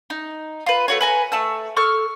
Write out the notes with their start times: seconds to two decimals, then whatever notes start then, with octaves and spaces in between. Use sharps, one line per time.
0.10 D#4
0.66 F4 B4
0.88 A3 F#4 C#5
1.01 B4 G#5 A#5
1.32 A3 A5 E6
1.76 A4 C#6 E6 F6